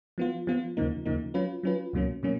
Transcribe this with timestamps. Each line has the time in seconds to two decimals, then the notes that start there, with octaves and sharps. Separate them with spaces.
0.18 F3 B3 F4
0.47 F3 B3 F4
0.77 D#2 C#3 F3 A#3 D#4
1.05 D#2 C#3 F3 A#3 D#4
1.34 F#3 C#4 F4 B4
1.63 F#3 C#4 F4 B4
1.93 C#2 B2 F#3 A#3 C#4
2.23 B2 F#3 A#3 C#4